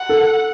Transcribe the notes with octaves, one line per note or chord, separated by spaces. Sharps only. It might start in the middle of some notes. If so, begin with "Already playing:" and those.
Already playing: F#5
A4